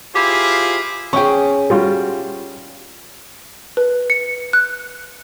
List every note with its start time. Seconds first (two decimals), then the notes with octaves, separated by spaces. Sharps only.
0.15 E4 F4 G4 G#4 C5
1.13 C#4 G#4 G5 C#6
1.70 G3 F4 F#4
3.77 B4
4.10 C#7
4.53 F#6